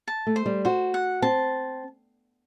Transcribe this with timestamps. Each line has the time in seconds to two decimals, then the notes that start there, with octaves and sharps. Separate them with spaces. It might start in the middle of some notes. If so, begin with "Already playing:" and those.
0.08 A5
0.27 A3
0.36 C5
0.46 G3
0.65 F#4 C5
0.94 F#5
1.22 C4 A5